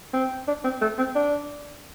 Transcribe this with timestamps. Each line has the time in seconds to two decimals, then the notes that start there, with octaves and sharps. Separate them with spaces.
0.14 C4
0.48 D4
0.64 C4
0.81 A3
0.98 C4
1.15 D4